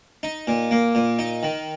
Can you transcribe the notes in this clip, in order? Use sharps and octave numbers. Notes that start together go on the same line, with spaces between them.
D#4
A#2
A#3
A#2
D#4
D#3